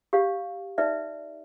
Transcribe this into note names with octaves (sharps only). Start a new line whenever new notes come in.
G4 C#5 F5
D#4 B4 D5 E5